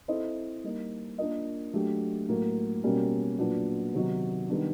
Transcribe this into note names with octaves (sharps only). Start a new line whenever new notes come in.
C4 E4 A4 C5 D#5
G3 A#3 D#4
A#3 D4 F4 A#4 D#5
F#3 A3 D4 G4
A2 F#3 A#3
B2 G3 A#3 C#4
A#2 F#3 B3 D4 F#4
C3 D#3 F#3 B3 D#4
D#3 G3 B3 D4